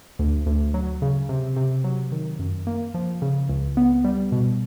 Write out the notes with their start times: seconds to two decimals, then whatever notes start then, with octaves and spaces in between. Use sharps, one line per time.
0.19 D2
0.46 D2
0.74 F#3
1.02 C#3
1.29 C3
1.56 C3
1.84 F#3
2.12 D#3
2.39 F#2
2.67 A#3
2.94 F3
3.22 C#3
3.49 C#2
3.77 B3
4.05 G3
4.32 B2